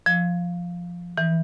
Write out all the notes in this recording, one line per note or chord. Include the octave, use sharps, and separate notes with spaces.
F3
E3